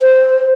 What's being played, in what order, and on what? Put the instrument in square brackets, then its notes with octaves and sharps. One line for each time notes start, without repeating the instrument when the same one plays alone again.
[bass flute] C5